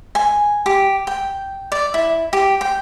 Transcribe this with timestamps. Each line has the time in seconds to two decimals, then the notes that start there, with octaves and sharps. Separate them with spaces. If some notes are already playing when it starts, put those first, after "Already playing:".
0.15 G#5
0.66 G4
1.07 G5
1.72 D5
1.94 E4
2.33 G4
2.61 G5